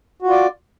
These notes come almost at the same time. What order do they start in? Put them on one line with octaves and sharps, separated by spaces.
F#4 F4 D5